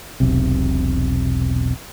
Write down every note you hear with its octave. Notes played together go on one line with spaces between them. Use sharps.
E1 B1 C3